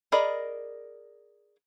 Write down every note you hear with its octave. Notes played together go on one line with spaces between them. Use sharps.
G#4 A#4 D5 D#5 B5